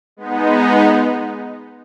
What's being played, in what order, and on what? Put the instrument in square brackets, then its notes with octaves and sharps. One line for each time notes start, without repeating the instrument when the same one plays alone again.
[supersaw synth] G#3 B3 D#4